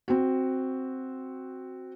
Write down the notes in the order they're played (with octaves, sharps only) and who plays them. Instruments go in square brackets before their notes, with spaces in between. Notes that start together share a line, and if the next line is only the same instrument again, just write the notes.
[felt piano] C4 F#4